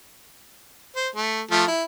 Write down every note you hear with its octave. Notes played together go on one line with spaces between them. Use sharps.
C5
A3
F3 A3 A5
E4